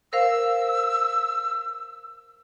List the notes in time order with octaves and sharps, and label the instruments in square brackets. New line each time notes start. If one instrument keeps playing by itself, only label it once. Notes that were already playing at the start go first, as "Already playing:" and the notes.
[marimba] A#4 C5 F5 [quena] E6